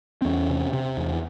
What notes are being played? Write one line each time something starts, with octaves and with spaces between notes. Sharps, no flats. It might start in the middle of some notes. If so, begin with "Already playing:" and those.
C4
E2 C#4
C3
C3
E2